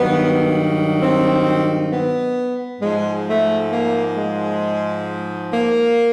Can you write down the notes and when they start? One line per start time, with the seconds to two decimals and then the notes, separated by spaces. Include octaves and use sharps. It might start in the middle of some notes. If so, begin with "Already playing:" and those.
Already playing: G2 D#3 F#3 B3
1.01 C4
1.91 B3
2.81 G#2 F3 G#3
3.26 A3
3.72 A#3
4.17 G#3
5.52 A#3